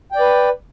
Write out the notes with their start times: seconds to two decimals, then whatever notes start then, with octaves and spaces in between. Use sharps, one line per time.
0.12 G5
0.16 D5
0.20 B4